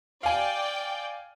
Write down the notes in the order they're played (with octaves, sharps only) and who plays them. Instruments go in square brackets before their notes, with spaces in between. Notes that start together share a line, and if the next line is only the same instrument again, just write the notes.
[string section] D5 G5 [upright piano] F5 G#5